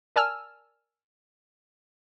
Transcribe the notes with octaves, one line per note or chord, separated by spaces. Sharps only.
A#4 D5 G#5 A5 E6 F6